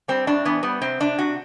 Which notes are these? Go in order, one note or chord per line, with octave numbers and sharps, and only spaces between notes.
G3 C4
A2 D4
E3 B3
G3 B3
C3 C4
C3 D4
C3 F#4